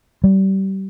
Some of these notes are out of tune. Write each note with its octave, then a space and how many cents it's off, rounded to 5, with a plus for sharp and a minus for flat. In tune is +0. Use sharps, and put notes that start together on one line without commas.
G3 -30